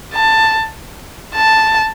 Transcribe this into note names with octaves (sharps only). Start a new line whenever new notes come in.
A5
A5